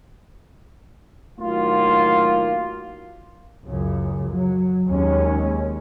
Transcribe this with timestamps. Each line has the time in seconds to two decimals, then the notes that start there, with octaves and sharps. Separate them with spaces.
1.38 A2 D#3 F#3 A#3 F4
3.65 C#2 F#2 C#3
4.33 F#3
4.88 D#2 G#3 C#4